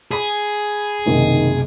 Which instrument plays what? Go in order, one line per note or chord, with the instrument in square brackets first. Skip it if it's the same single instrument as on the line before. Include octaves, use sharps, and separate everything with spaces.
[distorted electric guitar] G#4 [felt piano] B5 B6
[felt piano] F#1 B1 C3 [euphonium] D#3